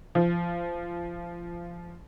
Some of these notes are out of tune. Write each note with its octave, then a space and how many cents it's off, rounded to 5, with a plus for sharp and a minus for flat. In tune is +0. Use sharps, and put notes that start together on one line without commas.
F3 -20